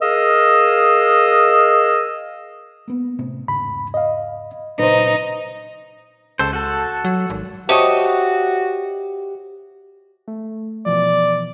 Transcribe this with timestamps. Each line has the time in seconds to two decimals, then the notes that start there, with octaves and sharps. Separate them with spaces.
0.01 G#4 A#4 D#5 F5 E6
2.88 A#3 B3
3.19 A2 C3 C4
3.48 E2 G#2 C#3 B5
3.94 D#5 F5
4.79 A#2 C#3 F#3 D#4 B4 C5
6.39 C#2 A4 C5
6.53 F#4 A4
7.05 F#3
7.30 G#1
7.69 F#4 G4 C5 C#5 D#5 E5 A5 C#6
10.28 A3
10.86 B2 E3 F3 D5